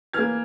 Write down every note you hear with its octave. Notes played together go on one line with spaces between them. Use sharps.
E3 A#3 F6 G#6